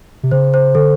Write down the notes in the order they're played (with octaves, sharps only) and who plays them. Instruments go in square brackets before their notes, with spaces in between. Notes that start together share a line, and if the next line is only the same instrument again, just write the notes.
[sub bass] C3
[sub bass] C#3 [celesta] C5
[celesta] C5
[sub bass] D3 [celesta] A4